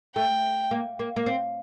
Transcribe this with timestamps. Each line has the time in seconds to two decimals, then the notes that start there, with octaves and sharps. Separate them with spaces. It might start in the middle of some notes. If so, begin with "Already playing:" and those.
0.16 A3 G5
0.71 A#3
0.99 A#3
1.16 A#3
1.26 C4